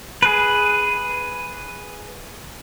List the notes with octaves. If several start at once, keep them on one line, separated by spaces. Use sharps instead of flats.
G#4 B4